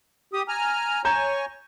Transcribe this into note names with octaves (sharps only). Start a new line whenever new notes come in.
G4 D#6
G#5 A#5 F6
C#5 G#5 A#5 C#6 G6 E7